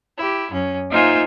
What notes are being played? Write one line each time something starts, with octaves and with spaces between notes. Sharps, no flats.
E4 G4
F#2 C#4
A#3 D#4 F4 C5 E5 G#5